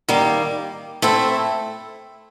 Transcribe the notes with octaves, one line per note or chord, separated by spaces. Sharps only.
D#3 G3 A#3
A3 C4 E4 A4